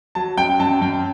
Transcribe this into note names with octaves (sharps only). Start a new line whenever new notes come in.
F#3 A5
F#2 G5
F#2 A5
F#2 G5